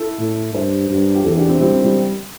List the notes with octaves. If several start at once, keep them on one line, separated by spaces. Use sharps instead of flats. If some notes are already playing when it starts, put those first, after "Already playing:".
Already playing: E4 A4
A2
G2 G4 C5
G2
G4
E2 E4 A4
D4 G4
C4 E4
G3 C4
G3